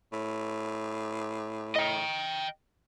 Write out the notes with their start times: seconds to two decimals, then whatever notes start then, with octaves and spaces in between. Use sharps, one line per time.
0.12 A2
1.76 D#5 G5